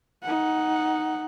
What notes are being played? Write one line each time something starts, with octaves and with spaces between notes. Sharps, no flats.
D#4 F#5